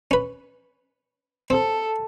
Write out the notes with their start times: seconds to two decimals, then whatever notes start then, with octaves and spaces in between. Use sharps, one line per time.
0.11 C#4 B4
1.50 C4 A4